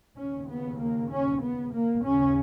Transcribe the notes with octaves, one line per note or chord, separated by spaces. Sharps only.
D#2 C#3 C#4
B3
A#3
C#4
B3
A#3
D#2 C#3 C#4